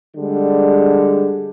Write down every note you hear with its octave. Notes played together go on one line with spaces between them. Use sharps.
D3 G3 G#3